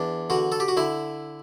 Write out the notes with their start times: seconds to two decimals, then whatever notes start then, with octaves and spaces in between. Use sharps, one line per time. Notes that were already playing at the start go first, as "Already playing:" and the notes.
Already playing: E2 D4
0.30 D3 F#4
0.52 A4
0.60 G4
0.68 F#4
0.77 D3 E4